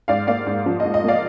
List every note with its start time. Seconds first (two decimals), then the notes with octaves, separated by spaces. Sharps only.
0.08 G#2 D5 F5
0.27 A#3 D5 F5
0.46 G#2
0.66 F3
0.80 G#2 D#5
0.94 D#5
1.04 A#3 D5 F5